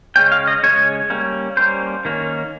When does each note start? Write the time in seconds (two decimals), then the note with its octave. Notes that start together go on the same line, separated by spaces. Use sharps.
0.16 C#3 G#3 C#4 G5
0.32 F5
0.47 D#5
0.63 C#3 G#3 C#4 C#5
1.10 G3 A#3 C#4
1.57 G3 A#3 C#4 C5
2.05 D#3 A#3 C#4